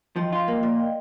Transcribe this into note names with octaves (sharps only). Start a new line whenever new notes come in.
F3 D#5 G5
F4
A#3
A#2 D5 F5
D#5 G5